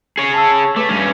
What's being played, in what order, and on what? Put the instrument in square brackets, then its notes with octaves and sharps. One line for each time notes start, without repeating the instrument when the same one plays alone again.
[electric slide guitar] G#4 C#5
[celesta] A5 E6
[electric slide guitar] A3 [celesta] B4 D6
[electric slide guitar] G2 C#4